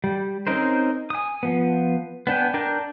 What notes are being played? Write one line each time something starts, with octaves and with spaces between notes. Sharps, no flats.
G3
C4 C#4 D#4 A#4 C5
G#5 D#6
F3 B3
B3 D4 G5 G#5
D4 A#4 G5 A5